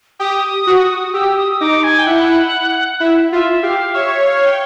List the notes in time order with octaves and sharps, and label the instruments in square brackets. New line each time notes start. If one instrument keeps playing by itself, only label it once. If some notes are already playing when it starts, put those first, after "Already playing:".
[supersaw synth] G4 [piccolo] D#6
[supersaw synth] F#4
[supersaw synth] G4 [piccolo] E6
[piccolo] D#6
D#6
[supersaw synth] D#4 [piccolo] D6
[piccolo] G#5
G5
[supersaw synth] E4 [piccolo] F#5
[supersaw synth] E4 [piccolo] E5
[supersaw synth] F4 [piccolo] E5
[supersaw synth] G4 [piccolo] F5
[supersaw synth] C#5 [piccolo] E5
[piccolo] F5
G5